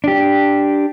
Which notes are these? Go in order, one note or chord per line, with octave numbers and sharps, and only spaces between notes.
D4 G4